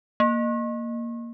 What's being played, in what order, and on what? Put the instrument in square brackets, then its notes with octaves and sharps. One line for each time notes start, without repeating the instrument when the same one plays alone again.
[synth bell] A#3